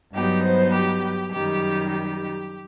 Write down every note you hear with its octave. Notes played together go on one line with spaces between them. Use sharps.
G2 F#3 B3 D#4 G4
C5
G4
F#2 D#3 G3 D#4 G4
G4